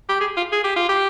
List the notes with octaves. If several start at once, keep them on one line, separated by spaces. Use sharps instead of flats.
G4
G#4
F4
G#4
G4
F4
G4